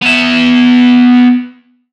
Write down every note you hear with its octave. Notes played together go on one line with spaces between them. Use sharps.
B3 E5